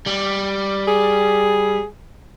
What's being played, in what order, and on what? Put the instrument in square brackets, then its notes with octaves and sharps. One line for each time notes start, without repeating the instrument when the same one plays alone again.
[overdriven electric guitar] G3
[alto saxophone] G#4